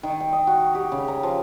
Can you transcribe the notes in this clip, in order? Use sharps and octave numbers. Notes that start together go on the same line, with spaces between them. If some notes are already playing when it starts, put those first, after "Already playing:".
D#3
G5
D#5
F#4
G4
C#3
A#5
F3